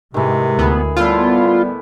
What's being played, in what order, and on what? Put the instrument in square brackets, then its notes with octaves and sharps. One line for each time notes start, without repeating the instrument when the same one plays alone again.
[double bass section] G#2 G#3 [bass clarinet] C3 [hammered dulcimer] D#3 E3
[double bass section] D2 [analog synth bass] B3 [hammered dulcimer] E4 G#4
[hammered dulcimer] A2 E4 [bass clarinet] G3 [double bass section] B3 [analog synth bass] F4